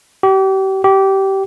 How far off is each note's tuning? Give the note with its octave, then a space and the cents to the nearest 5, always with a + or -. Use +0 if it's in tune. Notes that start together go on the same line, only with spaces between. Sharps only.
G4 -35
G4 -20